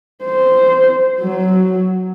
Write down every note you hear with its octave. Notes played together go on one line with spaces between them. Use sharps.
C5
F#3